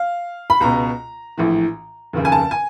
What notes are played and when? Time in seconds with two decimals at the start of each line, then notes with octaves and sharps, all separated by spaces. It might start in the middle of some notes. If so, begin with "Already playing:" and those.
Already playing: F5
0.50 B5
0.61 C#2 B2 A#5
1.38 A#1 A2 E3
2.13 F1 D#2 C#3
2.25 G#5
2.32 A5
2.51 G#5